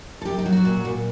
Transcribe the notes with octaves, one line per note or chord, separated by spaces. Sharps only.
A4
F#2 G4
D#4
F#3
F#4
A#2
A#2